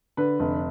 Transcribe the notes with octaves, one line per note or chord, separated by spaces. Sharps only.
D3 B4
F1